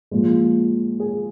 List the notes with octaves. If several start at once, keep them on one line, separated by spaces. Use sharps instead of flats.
A#2 F3 G#3
G#4